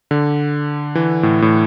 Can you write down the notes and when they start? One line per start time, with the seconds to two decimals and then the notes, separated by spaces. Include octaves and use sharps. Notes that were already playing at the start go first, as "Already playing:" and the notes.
0.11 D3
0.95 E3
1.23 A2
1.42 A2